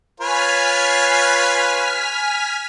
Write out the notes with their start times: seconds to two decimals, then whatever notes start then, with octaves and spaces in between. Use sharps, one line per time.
0.20 F4 B4 C#5 G#5 F6 B6